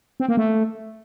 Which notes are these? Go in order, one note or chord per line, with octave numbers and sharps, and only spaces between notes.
C4
A#3
A3